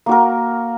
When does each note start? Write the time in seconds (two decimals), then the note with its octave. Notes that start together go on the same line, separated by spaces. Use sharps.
0.06 A#3
0.09 F#4
0.12 A#4